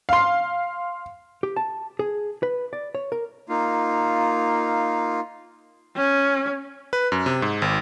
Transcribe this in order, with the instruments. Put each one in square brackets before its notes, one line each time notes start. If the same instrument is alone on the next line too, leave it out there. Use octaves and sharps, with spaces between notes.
[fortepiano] F5 C6
[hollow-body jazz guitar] G4
A5
G#4
B4
D5
C#5
A#4
[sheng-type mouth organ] A#3 D#4 F4 F5
[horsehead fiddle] C#4
[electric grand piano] B4
F#2
C3
G#2
G#1